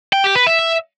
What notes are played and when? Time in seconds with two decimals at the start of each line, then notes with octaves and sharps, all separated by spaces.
0.13 G5
0.24 G4
0.35 B4
0.47 E5